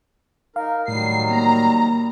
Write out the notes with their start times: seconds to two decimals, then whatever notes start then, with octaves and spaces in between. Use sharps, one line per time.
0.56 D#4 A#4 F5
0.88 A2 D#3 F#3 G3 C7
1.31 A#3 A#5